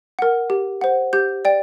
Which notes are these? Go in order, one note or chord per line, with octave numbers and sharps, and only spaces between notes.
A#4 F#5
G4
C5 F#5
G4 G6
D5 G5